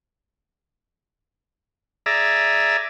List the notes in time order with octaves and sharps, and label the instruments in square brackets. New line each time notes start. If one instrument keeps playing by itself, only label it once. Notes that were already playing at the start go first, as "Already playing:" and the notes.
[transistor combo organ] G#4 D5 E5 A#5